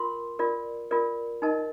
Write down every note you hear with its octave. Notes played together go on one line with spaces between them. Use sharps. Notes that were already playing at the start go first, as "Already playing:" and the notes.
Already playing: F4 A#4 C6
F4 A#4 D5
F4 A#4 D5
D#4 A#4 D#5 A5